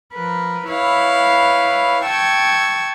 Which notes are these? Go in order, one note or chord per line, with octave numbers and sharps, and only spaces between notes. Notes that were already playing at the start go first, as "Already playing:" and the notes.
F3 A#4 B4
E4 B4 C#5 F5
G5 A5 C#6 E6 G#6